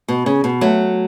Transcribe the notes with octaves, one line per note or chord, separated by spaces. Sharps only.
B2
C#3
B2
F#3 A3